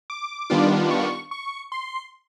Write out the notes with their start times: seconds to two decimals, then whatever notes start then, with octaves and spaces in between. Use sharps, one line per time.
0.10 D6
0.50 D#3 G3 B3 D4 F4
0.91 C#6
1.31 C#6
1.72 C6